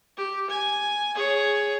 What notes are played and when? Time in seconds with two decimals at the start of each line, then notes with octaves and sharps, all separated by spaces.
0.17 G4
0.50 G#5
1.15 G#4 C#5